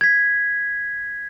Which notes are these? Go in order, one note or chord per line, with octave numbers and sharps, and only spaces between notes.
G#6 B6